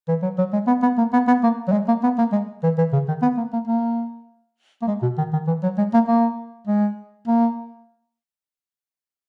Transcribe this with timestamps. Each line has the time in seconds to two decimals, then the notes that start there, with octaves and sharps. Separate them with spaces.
0.08 E3
0.23 F#3
0.38 F#3
0.53 G#3
0.67 B3
0.82 B3
0.98 A#3
1.13 B3
1.28 B3
1.43 A#3
1.68 F#3
1.72 G#3
1.88 A#3
2.04 B3
2.18 A#3
2.32 G#3
2.64 E3
2.78 E3
2.93 C#3
3.09 D#3
3.22 B3
3.38 A#3
3.53 A#3
3.68 A#3
4.82 A#3
4.88 G#3
5.02 B2
5.18 D#3
5.33 D#3
5.47 E3
5.63 F#3
5.78 G#3
5.94 A#3
6.08 A#3
6.67 G#3
7.28 A#3